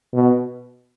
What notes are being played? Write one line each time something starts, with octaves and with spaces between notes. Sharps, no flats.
B2